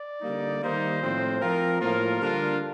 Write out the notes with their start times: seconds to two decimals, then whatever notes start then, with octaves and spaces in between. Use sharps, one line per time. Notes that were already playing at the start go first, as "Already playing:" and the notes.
Already playing: D5
0.22 D3 G3 A#3 D#4
0.61 D#3 G3 A#3 D#4 C5
1.02 A2 F3 C4
1.41 F3 C4 F4 A#4
1.81 A2 F3 A#3 F4 A#4
2.20 D3 G3 D4 F4